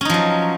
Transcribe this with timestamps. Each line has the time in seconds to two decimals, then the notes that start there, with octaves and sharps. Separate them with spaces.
0.01 C#4
0.05 D#4
0.10 F3
0.14 F#3